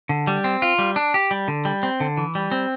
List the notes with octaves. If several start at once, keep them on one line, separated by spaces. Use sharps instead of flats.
D3
G3
C4
F4
G3
D4
G4
G3
D3
G3
C4
D3
E3
G3
C4